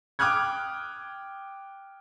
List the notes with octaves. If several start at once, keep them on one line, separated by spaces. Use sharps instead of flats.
G5 D6 D#6 F6 F#6 G#6